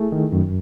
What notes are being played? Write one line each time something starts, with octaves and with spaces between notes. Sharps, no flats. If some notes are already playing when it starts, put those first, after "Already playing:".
Already playing: A3 E4 G#4
D#3
F#2